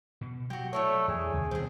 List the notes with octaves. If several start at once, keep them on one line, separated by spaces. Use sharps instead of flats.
B2
F#3 F#4 G4
A3 D4 E4 C#5
E2 G#4
D2 C3 D#3
B2 D#3 G3 C4 G#4